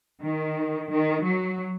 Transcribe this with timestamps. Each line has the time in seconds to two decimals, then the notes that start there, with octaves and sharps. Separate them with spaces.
0.20 D#3
0.90 D#3
1.24 F#3